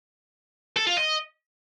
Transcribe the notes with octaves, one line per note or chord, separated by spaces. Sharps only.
A4
F4
D#5